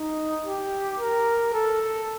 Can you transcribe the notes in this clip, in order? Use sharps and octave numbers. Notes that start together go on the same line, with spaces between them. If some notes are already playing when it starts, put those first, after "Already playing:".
Already playing: D#4
G4
A#4
A4